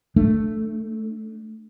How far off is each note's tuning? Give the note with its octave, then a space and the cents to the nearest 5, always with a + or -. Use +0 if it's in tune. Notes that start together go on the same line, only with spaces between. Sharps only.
A3 +0 D4 +5